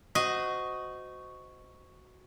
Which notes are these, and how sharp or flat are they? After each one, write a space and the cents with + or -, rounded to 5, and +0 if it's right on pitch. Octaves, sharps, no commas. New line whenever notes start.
F#4 +0 C5 -25 D#5 +0